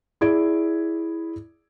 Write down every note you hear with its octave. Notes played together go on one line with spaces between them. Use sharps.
E4 G#4 D5 G#6 D7